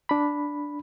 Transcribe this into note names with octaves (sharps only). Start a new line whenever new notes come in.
D4 B5